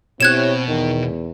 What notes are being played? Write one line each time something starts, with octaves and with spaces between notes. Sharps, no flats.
B2 C4 E4 G4 C#5 F#6 G#6 E7
E2 D#3